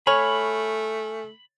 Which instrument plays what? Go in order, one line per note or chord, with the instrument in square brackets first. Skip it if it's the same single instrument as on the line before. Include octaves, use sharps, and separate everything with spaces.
[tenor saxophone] A3 [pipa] C#5 [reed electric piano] G#5 F6 [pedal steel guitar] B5